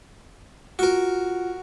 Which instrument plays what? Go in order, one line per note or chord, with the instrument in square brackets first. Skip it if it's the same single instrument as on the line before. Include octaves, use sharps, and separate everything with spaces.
[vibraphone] F4 F#5 [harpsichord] F#4 A#4